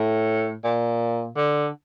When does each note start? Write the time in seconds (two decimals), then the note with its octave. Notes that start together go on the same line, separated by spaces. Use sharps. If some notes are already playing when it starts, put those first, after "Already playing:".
Already playing: A2
0.64 A#2
1.37 D3